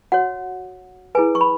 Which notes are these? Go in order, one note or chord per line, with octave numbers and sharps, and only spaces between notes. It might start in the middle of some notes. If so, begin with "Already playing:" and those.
F#4 C#5 F#5
E4 G#4 B4 G#5
C#6
B5